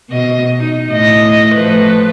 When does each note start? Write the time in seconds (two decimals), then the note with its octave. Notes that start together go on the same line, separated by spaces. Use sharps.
0.10 B2 D#5
0.60 D#4
0.89 A2 D#5
1.55 F3 A3 B4